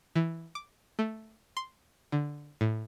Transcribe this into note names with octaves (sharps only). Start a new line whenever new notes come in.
E3
D6
A3
C6
D3
A2